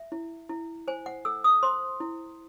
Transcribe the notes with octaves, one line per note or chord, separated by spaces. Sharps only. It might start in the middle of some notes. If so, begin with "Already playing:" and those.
Already playing: E5
E4
E4
C5 G#5
F#5
A4 E6
D#6
C5 C6
E4